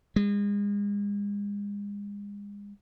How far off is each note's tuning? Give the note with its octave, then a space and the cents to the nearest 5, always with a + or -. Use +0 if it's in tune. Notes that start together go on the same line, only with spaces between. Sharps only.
G#3 -35